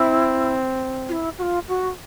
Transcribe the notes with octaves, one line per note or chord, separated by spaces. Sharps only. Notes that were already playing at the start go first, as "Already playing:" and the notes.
Already playing: C4 E4
F4
E4
F#4
F4
F#4